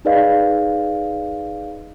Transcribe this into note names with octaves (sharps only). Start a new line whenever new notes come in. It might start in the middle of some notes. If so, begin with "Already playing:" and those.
D#4 G#4 B4 D5 D#5 F5